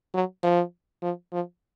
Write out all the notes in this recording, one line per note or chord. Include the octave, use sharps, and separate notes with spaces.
F#3
F3
F3
F3